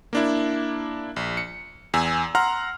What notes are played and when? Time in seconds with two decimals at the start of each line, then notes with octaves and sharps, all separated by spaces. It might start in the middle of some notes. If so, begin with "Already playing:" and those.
0.13 A#3 D4 E4
1.16 A#1
1.37 C#7
1.94 E2 G#5 E6
2.35 F#5 A#5 C6 F6